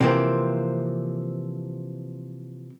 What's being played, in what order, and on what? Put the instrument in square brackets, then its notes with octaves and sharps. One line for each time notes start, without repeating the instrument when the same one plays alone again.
[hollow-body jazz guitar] C3 E3 F3 A#3 C4